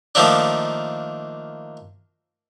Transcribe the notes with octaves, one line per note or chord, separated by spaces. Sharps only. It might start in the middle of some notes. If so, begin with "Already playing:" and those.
D#3 F3 A3 A#3 D4